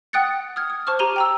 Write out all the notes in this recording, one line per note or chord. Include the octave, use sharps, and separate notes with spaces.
F#5 G5 D#6 F#6 A6 C#7
D#6 F6 G#6
D#6
C5 A5 C#6 D6 F6
G4 A#5 D#7 G7
G5 A#5 E6